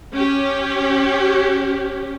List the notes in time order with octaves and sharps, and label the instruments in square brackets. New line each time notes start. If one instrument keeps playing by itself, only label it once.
[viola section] C#4 G4